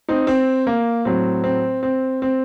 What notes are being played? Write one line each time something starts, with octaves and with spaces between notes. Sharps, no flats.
C4 D#4
C4
A#3
A2 F#3 C4
C4
C4
C4